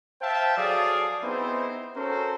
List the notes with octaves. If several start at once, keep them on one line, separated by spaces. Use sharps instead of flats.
C5 E5 F5 G5 A5
F#3 G#4 A4 D5 F5
B3 C4 D#4 E4 G#4 C5
C#4 F#4 A4 A#4 C5